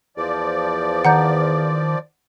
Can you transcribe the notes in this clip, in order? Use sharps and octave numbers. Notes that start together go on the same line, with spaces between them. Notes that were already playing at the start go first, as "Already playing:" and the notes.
E2 F3 D5
D#3 F#5 A#5 G6